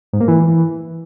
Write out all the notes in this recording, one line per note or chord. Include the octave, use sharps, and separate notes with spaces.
G#2
A#3
E3